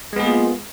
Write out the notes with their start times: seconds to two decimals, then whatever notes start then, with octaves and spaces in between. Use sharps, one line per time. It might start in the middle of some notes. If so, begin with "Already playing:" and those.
0.13 G#3
0.16 B3
0.20 G#4
0.23 A#3
0.27 F4